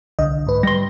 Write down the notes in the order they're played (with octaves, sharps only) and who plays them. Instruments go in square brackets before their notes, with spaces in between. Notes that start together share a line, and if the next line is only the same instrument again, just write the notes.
[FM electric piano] C2 D3 D#5
G#2 B4
[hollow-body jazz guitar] G3 C6 [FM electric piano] A#6